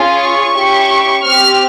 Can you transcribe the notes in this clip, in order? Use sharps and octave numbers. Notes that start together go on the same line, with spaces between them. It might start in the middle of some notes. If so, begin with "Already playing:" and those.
Already playing: C#4 F4 G#4
C#6
C#4 E4 G4
C4 G4 F6